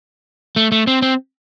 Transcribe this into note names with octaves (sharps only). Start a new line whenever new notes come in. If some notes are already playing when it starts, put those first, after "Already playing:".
A3
A3
C4
C4